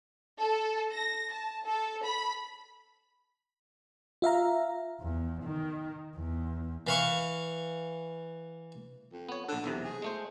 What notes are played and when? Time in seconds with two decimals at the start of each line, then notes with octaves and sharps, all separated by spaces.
0.40 A4
0.90 A#6
1.31 A5
1.65 A4
2.04 B5
4.22 F4 E5 F5 A#5
5.00 E2
5.44 D#3
6.16 E2
6.87 E3 F5 C#6
9.12 F2
9.29 B3 C#5
9.48 A#1 D3 A4
9.64 B1 E2 C3
9.84 G#4
10.02 G#3 A3 C5